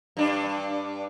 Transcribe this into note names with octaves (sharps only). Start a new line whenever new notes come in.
G2 D4